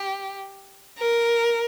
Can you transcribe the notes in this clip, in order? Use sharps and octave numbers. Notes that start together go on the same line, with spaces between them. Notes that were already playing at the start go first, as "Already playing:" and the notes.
Already playing: G4
A#4